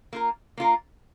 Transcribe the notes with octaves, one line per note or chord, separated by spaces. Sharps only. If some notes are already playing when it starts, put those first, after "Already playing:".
A#3 F4 A#4
A#3 F4 A#4